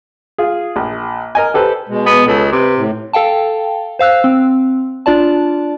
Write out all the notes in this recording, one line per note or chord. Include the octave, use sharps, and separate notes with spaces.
F4 G#4
A#1
A#4 D#5 G#5
G4 A4 B4 C5
B2 G#3
B3
C#2 A4
C3 B4
A2
A4 F5 G5 A5
C5 F5 E6 F#6
C4
D4 F4 D5 A5